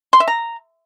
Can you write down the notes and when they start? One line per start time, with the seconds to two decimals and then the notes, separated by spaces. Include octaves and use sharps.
0.13 C6
0.20 E5
0.28 A#5